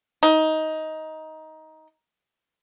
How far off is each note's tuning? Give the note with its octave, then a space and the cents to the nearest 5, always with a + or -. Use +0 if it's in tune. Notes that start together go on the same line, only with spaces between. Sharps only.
D#4 +15